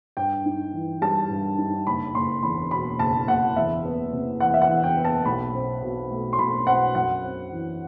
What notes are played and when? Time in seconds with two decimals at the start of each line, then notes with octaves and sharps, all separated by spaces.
0.17 G2 G5
0.46 D#4
0.74 E3
1.02 G3 A5
1.30 G2
1.58 D#4
1.86 F#1 B5
2.14 F#1 C6
2.43 E2 B5
2.71 B2 B5
2.99 F#1 A5
3.28 F#1 F#5
3.56 E2 E5
3.85 B3
4.13 C3
4.40 E3 F#5
4.54 E5
4.62 F#5
4.69 E2
4.84 G5
4.98 B3
5.05 A5
5.25 B1 B5
5.55 C4
5.82 B2
6.11 A3
6.33 C6
6.38 B1 B5
6.67 C4 F#5
6.95 F#2 F#5
7.24 C4
7.52 E3